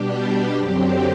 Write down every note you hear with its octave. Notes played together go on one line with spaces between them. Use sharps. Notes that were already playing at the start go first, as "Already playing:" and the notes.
Already playing: B2 G3 D4 G4
F#2 D3 F#3 C4 G4